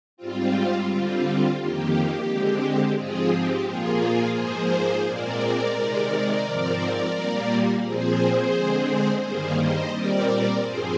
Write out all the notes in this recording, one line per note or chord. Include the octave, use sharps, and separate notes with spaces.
G#2 G3 C4 F4
D3 G3 C4 F4
F2 D#3 A#3 G4
D3 G#3 C4
G#2 F3 G#3 C4 F4 G#4
G4
A#2 F3 A#3 F4 G#4
G#2 F3 A#3 G#4 C5
A#2 G#3 C4 A#4 D5
C3 D#3 G#3
G#2 F3 C4
A#2 G3 A#3
A#2 F3 C4 G#4 C5
D3 G#3 C4
G2 D#3 G3 A#3 G#4 C5
C5 D#5
A#2 G3 C4 A#4 D5
G2 F3 C4 G#4 C5